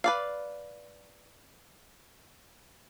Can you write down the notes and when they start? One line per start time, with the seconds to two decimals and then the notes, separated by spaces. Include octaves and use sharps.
0.04 B4 D5 F5